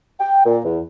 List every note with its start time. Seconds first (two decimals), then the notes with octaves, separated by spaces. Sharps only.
0.20 G5
0.46 A#2
0.65 E2